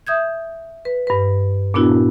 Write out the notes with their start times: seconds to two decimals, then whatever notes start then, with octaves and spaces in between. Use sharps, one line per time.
0.07 E5 D#6 G6 G#6
0.85 B4
1.07 G2 B4
1.74 A#2 B3 D4 E4 F#4